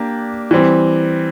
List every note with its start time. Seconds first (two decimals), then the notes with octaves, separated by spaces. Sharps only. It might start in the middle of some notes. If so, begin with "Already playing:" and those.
Already playing: A#3 D4 G4
0.51 E3 G3 C4